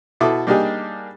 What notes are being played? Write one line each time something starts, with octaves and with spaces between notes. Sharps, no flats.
B2 E4 A4 D6
G3 A#3 D4 D#4 G4 G#4